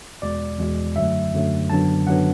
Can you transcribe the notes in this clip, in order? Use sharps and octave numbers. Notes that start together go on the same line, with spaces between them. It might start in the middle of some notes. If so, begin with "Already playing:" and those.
E2 B2 G#3 D5
E2 B2 G#3
F#2 D3 F#3 A3 E5
F#2 D3 F#3 A3
G#1 F#2 D3 F#3 B3 A5
G#1 F#2 D3 F#3 B3 F#5